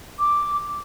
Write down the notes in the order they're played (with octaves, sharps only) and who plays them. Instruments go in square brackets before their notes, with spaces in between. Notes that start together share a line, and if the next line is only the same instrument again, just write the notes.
[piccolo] D6